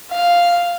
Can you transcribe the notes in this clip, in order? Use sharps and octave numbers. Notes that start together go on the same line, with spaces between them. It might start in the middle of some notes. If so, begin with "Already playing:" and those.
F5